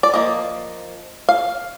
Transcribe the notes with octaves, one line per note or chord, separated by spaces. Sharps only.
D5
F3 A#3 D#5
F5